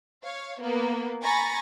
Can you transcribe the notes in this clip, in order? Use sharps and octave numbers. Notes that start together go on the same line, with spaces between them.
C#5 F5
A#3 B3
G#5 A#5 B5 C#6 A6 A#6